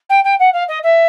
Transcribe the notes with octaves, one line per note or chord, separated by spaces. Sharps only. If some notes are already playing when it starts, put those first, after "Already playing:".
G5
G5
F#5
F5
D#5
E5